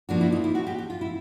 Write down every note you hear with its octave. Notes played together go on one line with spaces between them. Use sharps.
F3 A#3 D4 F#4
E4
D#4
E4
F#4
G4
F#4
F4
E4